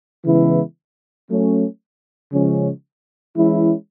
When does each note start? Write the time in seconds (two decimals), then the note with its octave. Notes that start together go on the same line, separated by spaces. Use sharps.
0.25 C#3 E3 G#3 B3 E4
1.29 F#3 A3 C#4
2.33 C#3 F3 G#3 C#4
3.36 E3 G#3 C#4 E4